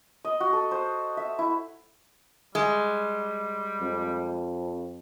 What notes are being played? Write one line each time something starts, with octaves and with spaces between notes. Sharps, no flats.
D#5
F#4
A4
C5
E5
E4
G3 G#3
F2